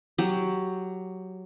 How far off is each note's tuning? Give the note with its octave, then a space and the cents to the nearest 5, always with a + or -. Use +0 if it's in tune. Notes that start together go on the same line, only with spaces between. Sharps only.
F#3 +5 G4 +0